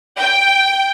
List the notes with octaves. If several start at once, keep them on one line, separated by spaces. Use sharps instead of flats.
G5